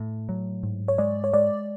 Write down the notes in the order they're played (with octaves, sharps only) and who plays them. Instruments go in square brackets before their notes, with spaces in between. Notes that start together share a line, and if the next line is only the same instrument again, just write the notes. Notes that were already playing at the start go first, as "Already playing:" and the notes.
Already playing: [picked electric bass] A2
F#3
G#2
[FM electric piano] C#5
[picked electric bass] G#3 [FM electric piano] D5
[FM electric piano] C#5
[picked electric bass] G#3 [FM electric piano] D5